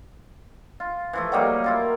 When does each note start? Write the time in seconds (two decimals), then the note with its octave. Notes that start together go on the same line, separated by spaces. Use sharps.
0.80 F4
1.13 E3 F3 A3
1.32 F#3 G3 A#3 D#4
1.64 E4 F4 A#4